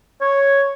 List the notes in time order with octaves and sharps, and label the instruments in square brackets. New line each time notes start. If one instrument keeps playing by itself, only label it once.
[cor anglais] C#5